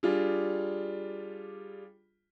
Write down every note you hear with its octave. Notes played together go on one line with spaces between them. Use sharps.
G3 D4 F4 G#4